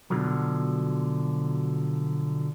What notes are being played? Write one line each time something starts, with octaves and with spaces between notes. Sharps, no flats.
B2 D3 F3 F#3